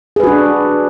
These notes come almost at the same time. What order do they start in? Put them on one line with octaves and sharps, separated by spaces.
G#4 B4 F#4 D4